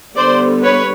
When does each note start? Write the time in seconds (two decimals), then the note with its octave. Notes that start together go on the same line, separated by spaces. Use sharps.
0.15 D3 G3 B3 C5 D5
0.63 B4 C#5